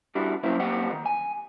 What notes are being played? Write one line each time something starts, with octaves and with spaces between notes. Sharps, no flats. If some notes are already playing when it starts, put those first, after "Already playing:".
G3 D4 E4 F#4
F#3 A#3 C#4 E4 C5 E5
F#3 A#3 C4 G4 D#5 F#5
E2 D#3
G#5